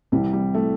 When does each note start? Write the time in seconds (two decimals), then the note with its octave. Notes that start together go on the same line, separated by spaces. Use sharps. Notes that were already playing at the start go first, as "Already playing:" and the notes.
0.12 C2 C3 E3 G3
0.33 G3
0.54 A3